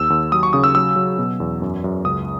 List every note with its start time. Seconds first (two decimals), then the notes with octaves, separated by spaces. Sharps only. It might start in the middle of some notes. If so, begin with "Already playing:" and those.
Already playing: D#2 E6
0.10 D#2
0.32 F#3 D#6
0.43 C#6
0.53 C#3 D#6
0.64 E6
0.75 F#3 E6
0.96 F#3
1.18 B2
1.40 E2
1.62 F#2
1.84 F#2
2.05 C#2 D#6